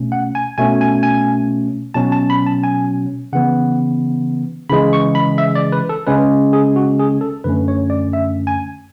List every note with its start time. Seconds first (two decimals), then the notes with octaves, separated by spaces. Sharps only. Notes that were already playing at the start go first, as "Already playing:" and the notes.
Already playing: B2 A3 C#4
0.12 F#5
0.35 G#5
0.58 B2 A3 C#4 G#5
0.81 G#5
1.03 G#5
1.94 B2 F#3 C#4 A5
2.12 A5
2.30 B5
2.46 A5
2.63 G#5
3.33 C#3 E3 B3 F#5
4.69 C#3 E3 G#3 B5
4.93 C#6
5.15 B5
5.38 E5
5.55 D5
5.72 B4
5.89 A4
6.07 C#3 G#3 C#4 B4
6.53 G#4
6.76 F#4
6.99 G#4
7.21 A4
7.44 F#2 D3 A3 C#4 B4
7.68 C#5
7.90 D5
8.13 E5
8.47 G#5